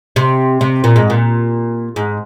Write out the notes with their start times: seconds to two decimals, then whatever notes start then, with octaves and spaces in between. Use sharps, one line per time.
0.16 C3
0.61 C3
0.84 A#2
0.96 G#2
1.10 A#2
1.96 G#2